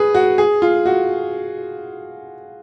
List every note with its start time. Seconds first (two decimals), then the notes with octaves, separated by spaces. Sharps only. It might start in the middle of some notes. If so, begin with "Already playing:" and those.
Already playing: G#4 B4
0.15 F#4
0.38 G#4
0.62 F4
0.86 F#4